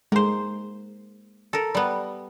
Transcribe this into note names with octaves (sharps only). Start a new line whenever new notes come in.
G#3 A#3 C5
A4 A#4
G3 B3